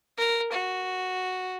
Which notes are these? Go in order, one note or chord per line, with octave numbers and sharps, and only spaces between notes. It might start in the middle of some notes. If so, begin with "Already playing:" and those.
A#4
F#4